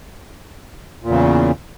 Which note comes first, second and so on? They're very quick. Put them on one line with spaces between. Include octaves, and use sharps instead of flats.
A#2 E2 C#3